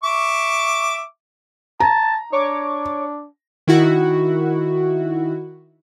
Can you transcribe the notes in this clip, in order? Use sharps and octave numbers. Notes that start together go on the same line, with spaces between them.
E5 C#6 D6
A5 A#5
D4 C#5 C#6 D6
D#3 E4 F#4